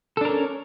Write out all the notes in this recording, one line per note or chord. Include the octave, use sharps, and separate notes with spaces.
C#4 D4 A4 A#4